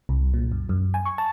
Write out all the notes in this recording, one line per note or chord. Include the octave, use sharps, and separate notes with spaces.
C2
A#2
F#2
F#2
G#5
C#6
A5